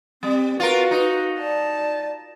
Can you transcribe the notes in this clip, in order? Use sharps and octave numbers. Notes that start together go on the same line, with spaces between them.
G3 C4
F4 F#4 A#4 B4
D#4
D5 A5